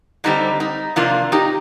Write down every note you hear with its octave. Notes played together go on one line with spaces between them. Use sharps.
D3 G3 C4 D#4
D#4
C3 F3 A#3 D4 F4
D#4 G4